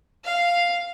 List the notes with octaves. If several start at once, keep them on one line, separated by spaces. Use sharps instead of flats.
F5